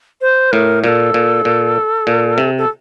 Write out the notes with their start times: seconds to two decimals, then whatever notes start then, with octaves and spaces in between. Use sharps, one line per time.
0.21 C5
0.52 A2 A#4
0.83 A#2 A4 A#4
1.14 A#2
1.45 A#2
2.07 A#2
2.38 C3
2.58 A4